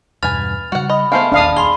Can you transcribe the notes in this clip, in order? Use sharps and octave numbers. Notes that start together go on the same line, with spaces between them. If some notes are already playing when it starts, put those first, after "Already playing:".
E2 G2 B2 B4 G#5 F6 A6 F7
C#3 G3 F#4 F#5
D#5 B5
G#3 A3 B3 C#4 C5 F5
E1 A#1 D#2 D4 F5 D#6
G#4 B5 C6 G7